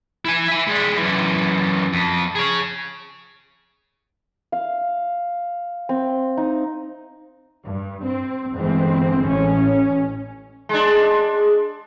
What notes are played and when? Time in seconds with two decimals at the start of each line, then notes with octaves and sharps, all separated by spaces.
0.25 E4 G#5
0.48 E5 G#5
0.67 G3 G#3
0.97 F#2 E3
1.93 F2
2.35 G#4 C#5
4.52 F5
5.89 C4
6.37 D#4
7.65 G2
8.05 C4
8.55 G1 E3 G#3 C4
9.29 A1 C#4
10.69 G#3 D4